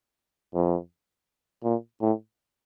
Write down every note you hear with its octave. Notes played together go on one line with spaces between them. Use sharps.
F2
A#2
A2